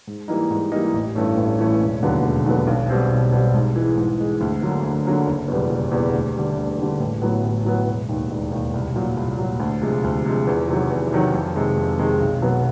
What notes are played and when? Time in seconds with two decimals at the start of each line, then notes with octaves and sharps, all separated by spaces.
0.07 G#2
0.28 E3 G3 A#3 D#4
0.51 G#2
0.72 E3 G3 A#3 D#4
0.94 A1
1.15 G2 E3 A3 C#4
1.37 A1
1.58 G2 E3 A3 C#4
1.80 E1
2.03 D#2 D3 F#3 B3
2.23 E1
2.46 D#2 D3 F#3 B3
2.67 B1
2.89 B2 G3 C4
3.11 B1
3.32 B2 G3 C4
3.54 G#2
3.76 E3 G#3
3.97 G#2
4.18 E3 G#3
4.41 D2
4.62 D3 F#3 A#3
4.83 D2
5.06 D3 F#3 A#3
5.26 F#1
5.48 E2 B2 G3 B3
5.70 F#1
5.91 E2 B2 G3 B3
6.14 D2
6.36 D3 G3
6.57 D2
6.78 D3 G3
7.00 A1
7.22 A2 F#3 B3
7.43 A1
7.65 A2 F#3 B3
7.87 E1
8.09 D#2 D#3
8.31 E1
8.51 D#2 D#3
8.74 C2
8.96 A#2 F#3
9.17 C2
9.39 A#2 F#3
9.60 D2
9.81 C3 F3 G#3
10.04 D2
10.25 C3 F3 G#3
10.47 E2
10.68 C3 D#3 F#3
10.90 E2
11.12 C3 D#3 F#3
11.34 F2
11.56 C3 D#3 G#3
11.77 F2
11.99 C3 D#3 G#3
12.20 B1
12.42 B2 F#3 B3